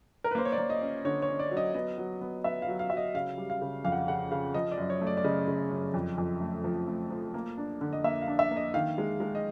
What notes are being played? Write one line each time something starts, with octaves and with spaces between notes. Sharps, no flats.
A#4
B4
A#3 C5
C#5
D5
A#3
D#5
C#4
D3 C#5
C#5
C#4
D5
F#3
D#5
B3 D#5
F#3
B3
B3 E5
F5
F#3
F5
F#3 E5
D#5
C#3 F5
G3
F5
C#3
F2 F5
F#5
F5
C#3 F#5
C#3 F5
F3 D#5
D5
F#2
C#5
A3
D5
D5
C#3 D#5
C#3
F#2
F2
F2
A3
F3
A3
F3
A#3
D4
D3
D#5
A#3 E5
F5
D4
E5
A#3
D#5
D#3 F5
G#3
G#3
D#5